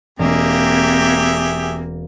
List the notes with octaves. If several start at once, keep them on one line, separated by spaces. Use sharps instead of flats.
E1 A#3 C4 G4 G#4 E5 D7